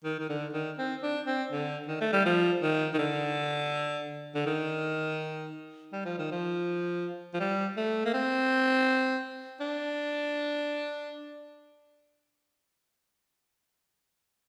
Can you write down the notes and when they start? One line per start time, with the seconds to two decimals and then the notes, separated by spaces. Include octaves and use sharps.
0.04 D#3
0.19 D#3
0.29 D3
0.54 D#3
0.78 C4
1.03 D4
1.27 C4
1.52 D3
1.88 D#3
2.01 A3
2.13 G3
2.26 F3
2.62 D#3
2.94 D#3
2.99 D3
4.35 D3
4.46 D#3
5.93 G3
6.06 F3
6.19 D#3
6.32 F3
7.34 F3
7.40 G3
7.77 A3
8.05 A#3
8.14 C4
9.61 D4